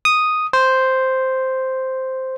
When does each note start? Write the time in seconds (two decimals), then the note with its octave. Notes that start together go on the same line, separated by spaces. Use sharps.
0.05 D#6
0.53 C5